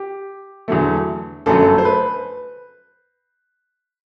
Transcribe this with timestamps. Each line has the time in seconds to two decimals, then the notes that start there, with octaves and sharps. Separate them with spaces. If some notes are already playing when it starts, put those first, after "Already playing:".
Already playing: G4
0.68 E2 D3 F#3 A3
1.46 G1 F#2 F#3 A3 A4
1.78 C5
1.85 B4